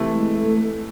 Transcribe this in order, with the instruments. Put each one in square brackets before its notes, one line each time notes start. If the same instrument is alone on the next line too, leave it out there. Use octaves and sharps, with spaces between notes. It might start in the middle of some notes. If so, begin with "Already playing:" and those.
Already playing: [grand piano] C3 E3 A3
[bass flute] G#3
A3